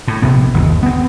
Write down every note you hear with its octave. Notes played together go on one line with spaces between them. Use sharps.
A2
A#1 C3 B3
G1 D#2
B3 C4